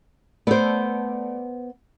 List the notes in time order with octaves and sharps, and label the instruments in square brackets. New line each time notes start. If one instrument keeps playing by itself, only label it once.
[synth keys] A3 D5 [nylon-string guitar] B3 C5